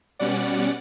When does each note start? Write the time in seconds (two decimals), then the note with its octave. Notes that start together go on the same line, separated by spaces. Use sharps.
0.19 B2 G3 C#4 D5 F#5